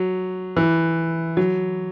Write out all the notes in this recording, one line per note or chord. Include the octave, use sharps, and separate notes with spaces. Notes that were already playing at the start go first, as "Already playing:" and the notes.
Already playing: F#3
E3
F#3